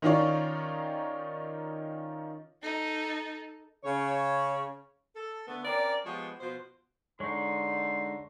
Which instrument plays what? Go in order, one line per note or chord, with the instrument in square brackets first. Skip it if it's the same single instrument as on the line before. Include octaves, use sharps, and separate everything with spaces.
[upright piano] D#3 C#4 D#4 F4 C#5 D5
[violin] D#4 A4
[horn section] C#3 C#5
[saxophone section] A4
D3 A3 B3
C4 C#4 A#4 D5
F3 G#3 B3 G4 C#5
B2 F3 B4 C5
[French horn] D3 [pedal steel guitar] G#3 D#4 [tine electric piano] C#5 C#6 [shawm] C6